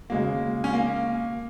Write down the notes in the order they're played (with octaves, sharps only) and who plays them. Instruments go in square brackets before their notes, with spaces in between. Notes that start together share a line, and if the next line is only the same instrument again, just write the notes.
[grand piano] C#3 G#3 F#4 [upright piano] A#3
[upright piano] C#4
A#3